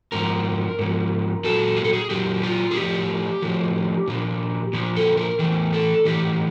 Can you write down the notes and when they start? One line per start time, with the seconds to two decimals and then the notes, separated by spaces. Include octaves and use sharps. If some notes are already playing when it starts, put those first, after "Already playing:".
0.12 G#2 F3 A#4
0.79 G#2 F3
1.44 A#2 F#3 A4
1.77 G#4
1.84 A4
1.93 G#4
2.10 A#2 F#3 G4
2.43 F4
2.71 G#4
2.76 A2 F3 G4
3.42 A2 F3
4.07 A#2 F3
4.73 A#2 F3
4.96 A4
5.17 A#4
5.39 E3 A#4
5.44 A2
5.73 A4
6.05 A2 E3 G4